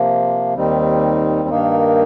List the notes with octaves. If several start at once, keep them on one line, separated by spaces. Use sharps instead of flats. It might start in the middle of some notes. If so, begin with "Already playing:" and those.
Already playing: C3 F3 A#3
D#2 D#3 G3 C4 D#4
G2 D#3 A#3 D#4